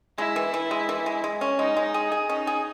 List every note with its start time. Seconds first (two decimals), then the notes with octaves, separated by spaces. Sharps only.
0.18 G#3 E4
0.36 E3
0.54 E3
0.71 G#3
0.89 E3
1.06 G#3
1.24 G#3
1.41 C#4
1.59 G#3 D#4
1.77 G#3
1.94 G#4
2.12 G#4
2.29 C#4 D#4
2.47 G#4